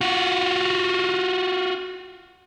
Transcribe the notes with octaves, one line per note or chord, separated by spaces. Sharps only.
F4 F#4